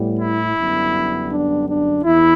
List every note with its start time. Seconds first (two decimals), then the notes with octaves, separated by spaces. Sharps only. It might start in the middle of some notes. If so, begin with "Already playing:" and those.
Already playing: A2 G3 B3
0.20 E4
0.56 F#2 D3 G3 B3
1.30 D4
1.67 D4
2.03 E2 E4